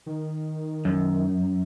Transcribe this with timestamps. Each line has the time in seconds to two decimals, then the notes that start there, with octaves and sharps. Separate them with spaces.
0.06 D#3
0.85 F#2